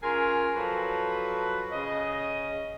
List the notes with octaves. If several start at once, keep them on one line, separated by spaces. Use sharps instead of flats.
C#4 F4 G#4 A#4
F3 F#3 F#4 A4 B4
C#3 D#5